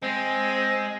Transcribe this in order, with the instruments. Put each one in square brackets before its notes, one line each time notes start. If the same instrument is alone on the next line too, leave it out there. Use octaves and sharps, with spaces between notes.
[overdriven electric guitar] G#3 [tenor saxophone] C4